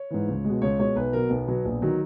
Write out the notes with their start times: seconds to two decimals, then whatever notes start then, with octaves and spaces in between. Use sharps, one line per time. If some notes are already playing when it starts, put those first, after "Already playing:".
Already playing: C#5
0.10 G#2 E3
0.28 C#2
0.44 B2 G#3
0.61 C#2 C#5
0.79 B2 G#3 C#5
0.95 B1 B4
1.13 B2 F#3 A#4
1.30 B1 B3
1.47 B2 F#3
1.65 A#1
1.82 D#3 F#3